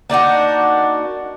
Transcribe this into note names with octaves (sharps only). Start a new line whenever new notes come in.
A#3 D4 D#4 F#4